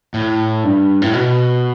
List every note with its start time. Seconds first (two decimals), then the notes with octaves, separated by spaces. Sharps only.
0.14 A2
0.64 G2
1.02 A2
1.13 B2